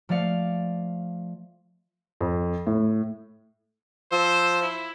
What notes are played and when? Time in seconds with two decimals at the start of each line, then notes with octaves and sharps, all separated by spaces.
0.09 F3 A3 D5 F5 C#7
2.21 F2
2.67 A2
4.12 F3 C5 E6
4.62 E4